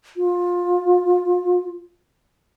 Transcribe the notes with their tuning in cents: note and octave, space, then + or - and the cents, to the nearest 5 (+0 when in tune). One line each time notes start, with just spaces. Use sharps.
F4 +20